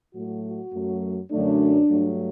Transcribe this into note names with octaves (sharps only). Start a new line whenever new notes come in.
A2 F#3 A3 F#4
F#4
F#2 F#3 A3
F#2 D3 F#3 A3 D4
G2 F#3 A3